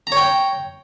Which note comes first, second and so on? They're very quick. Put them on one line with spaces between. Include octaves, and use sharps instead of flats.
A#5 C#5 G5